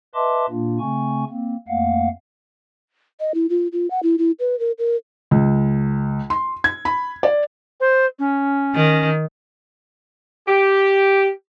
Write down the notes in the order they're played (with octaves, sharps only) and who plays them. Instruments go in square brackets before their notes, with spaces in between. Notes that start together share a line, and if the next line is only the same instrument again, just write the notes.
[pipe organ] B4 D#5 E5 A5 C6 D6
A#2 A#3 D4 F4
C#3 A3 C4 G#5 C#6
A#3 C4
F2 A3 A#3 F5 F#5
[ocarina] D#5
E4
F4
F4
F#5
E4
E4
B4
A#4
A#4
[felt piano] C#2
C6
G#6
B5
D5
[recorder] C5
C#4
[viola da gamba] D#3
[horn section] G4